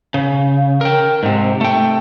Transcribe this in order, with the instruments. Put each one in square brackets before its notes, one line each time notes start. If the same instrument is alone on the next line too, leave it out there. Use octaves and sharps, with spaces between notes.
[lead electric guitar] C#3
A#4 G5
G#2 C3
A3 G5